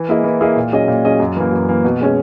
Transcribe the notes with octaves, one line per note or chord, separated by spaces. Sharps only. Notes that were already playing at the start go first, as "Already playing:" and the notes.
Already playing: E3
A#3 E4 G#4 D#5
E3
A#3 E4 G#4 D#5
A#2
F#3 C#4 G#4 D#5
A#2
F#3 C#4 G#4 D#5
F#2
E3 A#3
F#2
E3 A#3
B2
G#3 C#4 G#4